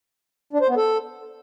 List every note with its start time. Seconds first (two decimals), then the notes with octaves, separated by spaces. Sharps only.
0.53 D4
0.61 C5
0.69 B3
0.77 A4